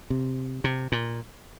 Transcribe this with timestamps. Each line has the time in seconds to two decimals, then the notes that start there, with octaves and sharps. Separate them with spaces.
0.10 C3
0.64 C3
0.92 A#2